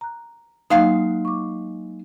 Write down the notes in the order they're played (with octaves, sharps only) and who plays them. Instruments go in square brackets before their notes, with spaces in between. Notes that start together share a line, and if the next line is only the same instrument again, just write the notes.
[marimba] A#5 F#6
[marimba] F#3 A#3 D#4 [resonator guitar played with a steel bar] G#3 F5
[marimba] C#6 D6